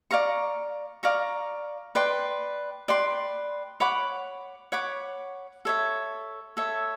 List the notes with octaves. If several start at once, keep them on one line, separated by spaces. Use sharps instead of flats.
D5 F5 A#5 C#6
D5 F5 A#5 C#6
B4 D5 G5 C6
B4 D5 G5 C6
C#5 F#5 B5 D6
C#5 F#5 B5 D6
A4 C#5 E5
A4 C#5 E5